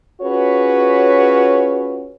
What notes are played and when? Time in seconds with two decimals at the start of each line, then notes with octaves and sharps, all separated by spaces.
0.21 C#4 F4 F#4 G#4 B4 C#5